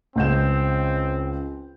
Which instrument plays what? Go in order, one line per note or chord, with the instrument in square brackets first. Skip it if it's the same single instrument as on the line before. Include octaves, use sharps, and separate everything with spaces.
[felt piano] C#2 G6 E7 [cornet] C4